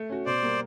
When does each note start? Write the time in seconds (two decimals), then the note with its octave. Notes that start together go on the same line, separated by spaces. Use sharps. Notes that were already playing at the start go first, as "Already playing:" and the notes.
Already playing: A3
0.10 C#4 F#4
0.26 B2 C5 D5
0.42 G3 A#3